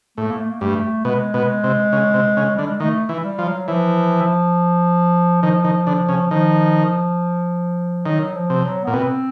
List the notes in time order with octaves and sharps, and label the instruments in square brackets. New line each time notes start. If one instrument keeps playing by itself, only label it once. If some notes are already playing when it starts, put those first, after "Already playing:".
[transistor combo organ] A2 [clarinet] A3
[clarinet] A#3
A3
A#3
[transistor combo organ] G2 [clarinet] A3
[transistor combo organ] B2 [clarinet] G#3
[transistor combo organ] B2
C3
C#3
C3
C#3
[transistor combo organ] D3 [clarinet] G3
[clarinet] G#3
[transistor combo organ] D#3 [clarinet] A3
[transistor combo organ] E3
[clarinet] G3
[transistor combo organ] F3
[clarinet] F#3
[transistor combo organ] E3 [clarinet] F3
[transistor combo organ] D#3 [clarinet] F3
[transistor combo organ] D#3
D3
C#3
[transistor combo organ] D#3 [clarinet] F3
[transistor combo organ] D#3 [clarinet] F#3
[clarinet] F3
[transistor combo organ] C3
[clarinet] F#3
[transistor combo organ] A#2 [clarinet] B3
[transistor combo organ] B2 [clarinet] C4